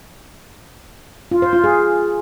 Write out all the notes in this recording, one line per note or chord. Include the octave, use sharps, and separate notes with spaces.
F4
C5
F4
G#4